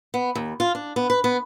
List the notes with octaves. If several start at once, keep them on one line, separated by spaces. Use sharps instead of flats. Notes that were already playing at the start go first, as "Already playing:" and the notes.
B3
D#2
F4
D4
B3
B4
B3